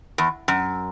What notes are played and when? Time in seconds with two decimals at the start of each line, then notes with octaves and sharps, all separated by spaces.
0.18 E2
0.48 F#2